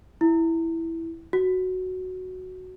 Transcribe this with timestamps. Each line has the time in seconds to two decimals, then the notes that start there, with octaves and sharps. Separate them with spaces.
0.21 E4
1.33 F#4